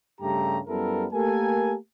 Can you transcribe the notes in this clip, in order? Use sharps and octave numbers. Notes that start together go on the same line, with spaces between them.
G2 C#3 G3 A3 G4 A#5
F#2 G3 B3 E4 A4 A#4
A3 A#3 G4 A4 A#4 G#5